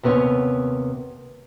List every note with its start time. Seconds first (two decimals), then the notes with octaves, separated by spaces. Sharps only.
0.03 D#2 C3 B3 C#4 C#5